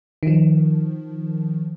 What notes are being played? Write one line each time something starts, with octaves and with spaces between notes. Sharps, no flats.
D#3 F3